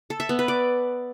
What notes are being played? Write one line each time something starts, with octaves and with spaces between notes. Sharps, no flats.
A4
E5
B3
B4
D5